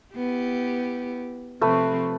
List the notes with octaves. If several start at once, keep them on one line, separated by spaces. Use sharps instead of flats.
B3 E4 G4
C3 F3 A3 C4 B4